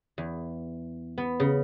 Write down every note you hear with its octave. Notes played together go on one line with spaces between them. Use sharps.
E2
B3
C#3